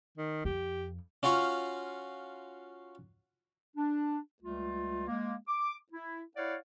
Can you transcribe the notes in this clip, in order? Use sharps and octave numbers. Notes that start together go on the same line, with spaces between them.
D#3
F2 G4
C#4 F4 F#4 F5 C#6
D4
C#2 G3 A3 F4
G#3 A#3
D6
E4
E4 C#5 D5 F5 F#5